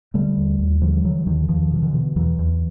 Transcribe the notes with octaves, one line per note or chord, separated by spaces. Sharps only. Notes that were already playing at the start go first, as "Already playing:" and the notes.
D3 G3 A3
D#2
D#2
D3 F3 G3
D3 E3 F#3
D#2 D#3 F3
E2 D#3 F3
B2 F3
D3 E3
B2
E2 E3 F#3
E2